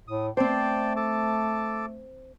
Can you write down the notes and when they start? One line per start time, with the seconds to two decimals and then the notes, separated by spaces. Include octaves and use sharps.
0.08 A2 D#6
0.37 A3 C4 C5 D5 G5 A5
0.96 A4 A5 D6